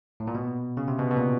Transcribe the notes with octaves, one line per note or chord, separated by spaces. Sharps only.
A2
A#2
B2
C#3
C3
B2
B2
A#2